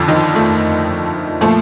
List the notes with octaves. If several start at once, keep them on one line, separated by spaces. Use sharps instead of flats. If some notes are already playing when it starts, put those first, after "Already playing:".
Already playing: F2 D3 F3
D#3 D#4
A3
A#2 F3 A3